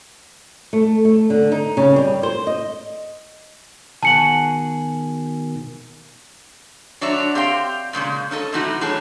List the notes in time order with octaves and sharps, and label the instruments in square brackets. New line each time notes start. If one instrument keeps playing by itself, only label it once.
[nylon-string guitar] A3
A3
D3
D#4
C#3
G3
C5
D#5
[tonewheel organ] B2 D#3 [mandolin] F#4 G#4 [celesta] A5 C#7 F#7
[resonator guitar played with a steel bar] F#3 D4 C#5 D5 E5
C4 G4 F5 G5
A#2 C#3 G3 G#3
C#4 D4 A4 D#5
C3 E3 A3 D#4 E4 F#4
A2 E3 F#3 G#4 C#5 A5